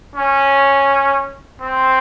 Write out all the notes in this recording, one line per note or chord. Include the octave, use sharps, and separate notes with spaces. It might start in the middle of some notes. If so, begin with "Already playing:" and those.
C#4
C4